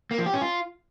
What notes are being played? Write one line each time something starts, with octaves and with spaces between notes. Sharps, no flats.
A#3
F3
G4
C#4
F4